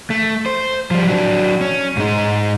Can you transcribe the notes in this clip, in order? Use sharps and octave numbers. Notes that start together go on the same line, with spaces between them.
A3
C5
F3 G3
F#3 D4
C#4
G#2 D#4